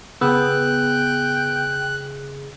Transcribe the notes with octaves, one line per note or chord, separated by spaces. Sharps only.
C#3 B3 G#4 G5 E6 F#6